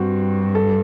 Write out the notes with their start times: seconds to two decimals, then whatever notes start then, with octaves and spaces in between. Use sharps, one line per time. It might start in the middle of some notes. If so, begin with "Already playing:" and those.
Already playing: G2 C4 F#4
0.55 A4